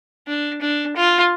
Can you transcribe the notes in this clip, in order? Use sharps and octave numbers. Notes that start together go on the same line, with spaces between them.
D4
D4
F4